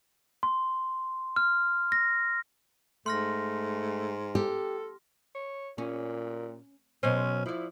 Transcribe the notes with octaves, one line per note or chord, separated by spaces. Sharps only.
C6
F6
A#6
G#2 A3 C6 F6 A#6
G4 A4
C#5
A#2 C#4
B2 F#3 C#4 C5
F3 E4 D5